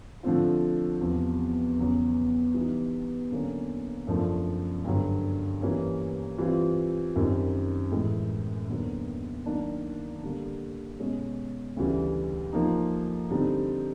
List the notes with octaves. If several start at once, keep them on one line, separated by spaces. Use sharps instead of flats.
D3 F3 A3 C4 F4
E2 C3 F3
E2 C#3 F#3 B3
E3 G3 B3 D#4
D3 F#3 A#3 C#4
F#2 C#3 F3 A3 D4
G2 D3 F#3
E3 G3 A#3 C#4
E3 G3 C4 F4
F#2 D#3 G3 C4
A2 E3 G#3
D#2 D3 F#3 B3
D#3 F#3 A#3 D4
D3 G3 A#3
B2 G#3 C#4
D2 C#3 E3 G3
F3 A#3 D#4
D3 G3 C4 D#4